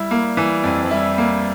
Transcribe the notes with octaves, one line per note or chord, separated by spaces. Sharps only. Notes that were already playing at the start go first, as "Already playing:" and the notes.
Already playing: G3 E4
A#3
E3
F2
F3
G3 E4
A#3